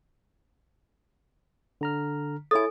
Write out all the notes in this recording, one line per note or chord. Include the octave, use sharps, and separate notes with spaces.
D3 A#5 F6
E4 A4 C#5 G#5 A6